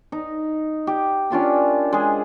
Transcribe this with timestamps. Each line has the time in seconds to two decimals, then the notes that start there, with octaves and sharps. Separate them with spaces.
0.12 D#4
0.87 G4
1.30 C#4 D4 F4 A#4
1.93 G#3 G#4